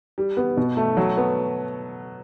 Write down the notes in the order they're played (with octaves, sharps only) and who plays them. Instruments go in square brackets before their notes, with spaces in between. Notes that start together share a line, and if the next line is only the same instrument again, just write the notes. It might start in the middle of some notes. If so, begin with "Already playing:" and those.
[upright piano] G3
B3
B2
A3
F#3
B3